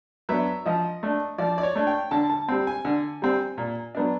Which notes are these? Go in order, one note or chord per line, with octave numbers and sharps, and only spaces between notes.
F#3 B3 D4 E5
F3 D#5
A3 D4
F3 D5
D5
C#5
A3 D4
G5
D3 A5
A5
G3 C4
G#5
D3
G3 C4
A#2
F#3 B3 D4